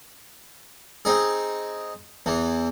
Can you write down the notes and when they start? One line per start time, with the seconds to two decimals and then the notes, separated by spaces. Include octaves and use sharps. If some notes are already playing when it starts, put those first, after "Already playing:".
1.05 C4 D#4 G#4
2.26 E2 E3